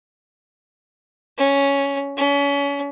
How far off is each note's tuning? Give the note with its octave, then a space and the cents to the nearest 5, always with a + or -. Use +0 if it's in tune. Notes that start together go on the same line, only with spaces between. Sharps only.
C#4 +5
C#4 +35